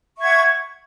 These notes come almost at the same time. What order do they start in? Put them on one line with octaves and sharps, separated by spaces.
C#6 E5 G#6 F#5